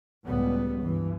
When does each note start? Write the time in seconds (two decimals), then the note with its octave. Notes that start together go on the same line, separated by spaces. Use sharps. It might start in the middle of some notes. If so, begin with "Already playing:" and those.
0.24 C#2 A2 G3 B3
0.81 G2 E3